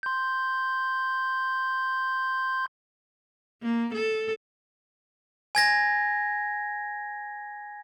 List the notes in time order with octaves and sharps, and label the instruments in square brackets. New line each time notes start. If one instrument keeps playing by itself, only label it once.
[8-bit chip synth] C6 G6
[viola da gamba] A#3
A4
[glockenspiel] G#5 G#6 A#6